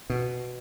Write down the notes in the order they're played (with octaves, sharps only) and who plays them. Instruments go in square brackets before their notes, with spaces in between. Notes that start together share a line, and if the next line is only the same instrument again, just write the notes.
[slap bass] B2